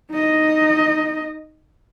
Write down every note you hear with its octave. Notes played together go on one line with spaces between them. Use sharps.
D#4 D#5